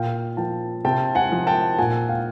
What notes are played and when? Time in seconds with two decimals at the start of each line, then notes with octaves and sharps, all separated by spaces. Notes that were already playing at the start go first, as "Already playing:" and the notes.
Already playing: A#2 F5 G5
0.37 F3 G5 A5
0.85 C3 G5 A5
1.15 F#5 G#5
1.32 F3
1.47 G5 A5
1.79 A#2 F#5 G#5
2.09 F5 G5